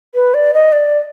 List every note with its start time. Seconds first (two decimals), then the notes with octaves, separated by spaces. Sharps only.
0.15 B4
0.34 D5
0.54 D#5
0.72 D5